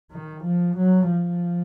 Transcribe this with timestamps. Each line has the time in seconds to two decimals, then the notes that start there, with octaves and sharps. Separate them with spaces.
0.12 D#3
0.44 F3
0.77 F#3
1.10 F3